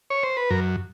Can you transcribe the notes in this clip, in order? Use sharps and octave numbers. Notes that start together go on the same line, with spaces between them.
C#5
C5
B4
F#2 A#4